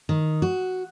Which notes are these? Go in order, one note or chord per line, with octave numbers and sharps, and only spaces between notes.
D#3
F#4